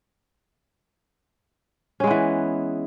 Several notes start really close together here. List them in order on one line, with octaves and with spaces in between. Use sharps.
C#4 G#3 B3 E3